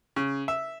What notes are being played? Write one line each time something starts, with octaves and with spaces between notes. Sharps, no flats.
C#3
E5